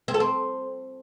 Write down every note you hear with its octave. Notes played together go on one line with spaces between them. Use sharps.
C4
A4
C4